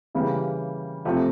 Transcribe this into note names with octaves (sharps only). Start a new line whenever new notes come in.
C#3 E3 G3 A#3
C3 F3 A3